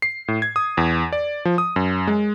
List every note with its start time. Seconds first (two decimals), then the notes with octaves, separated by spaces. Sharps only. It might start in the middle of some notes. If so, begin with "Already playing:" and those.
0.02 C7
0.28 A2
0.42 G#6
0.56 D#6
0.77 E2
1.13 D5
1.45 F3
1.58 D#6
1.76 F#2
2.08 G#3